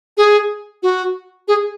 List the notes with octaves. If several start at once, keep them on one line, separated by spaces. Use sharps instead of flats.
G#4
F#4
G#4